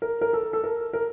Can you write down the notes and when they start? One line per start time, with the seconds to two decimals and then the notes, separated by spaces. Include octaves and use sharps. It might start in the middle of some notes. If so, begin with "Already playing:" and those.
0.02 A#4
0.21 A#4
0.33 A4
0.53 A4
0.64 A#4
0.93 A#4